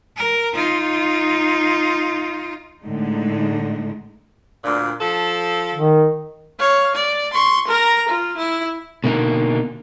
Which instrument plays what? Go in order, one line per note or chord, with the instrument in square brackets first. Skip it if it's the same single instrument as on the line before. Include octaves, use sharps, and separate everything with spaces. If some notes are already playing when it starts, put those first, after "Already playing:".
[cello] A#4
D#4 F4
[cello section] A2 D3 G#3 D#4
[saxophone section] D2 A#2
F3 A4
[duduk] D#3
[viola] C#5 F5
D5
C6 C#6
A#4 A#5
F4
E4
[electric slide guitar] B2 D3 A#3 D#4